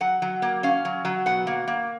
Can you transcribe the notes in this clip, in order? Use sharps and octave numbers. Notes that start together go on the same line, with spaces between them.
F#3 F#5
F#3
A#3
C#4 F5
F#3
F#3
B2 F#5
A#3
A#3